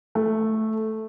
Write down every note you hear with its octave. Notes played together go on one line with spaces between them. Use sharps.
A3